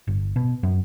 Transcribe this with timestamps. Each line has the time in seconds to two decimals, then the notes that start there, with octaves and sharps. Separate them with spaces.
0.07 G1
0.36 B2
0.63 F#2